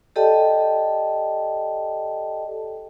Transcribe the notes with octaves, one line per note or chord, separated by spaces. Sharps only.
G4 A4 D5 D#5 G5 A5